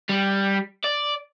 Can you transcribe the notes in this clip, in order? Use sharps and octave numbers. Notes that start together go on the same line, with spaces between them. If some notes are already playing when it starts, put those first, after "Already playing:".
G3
D5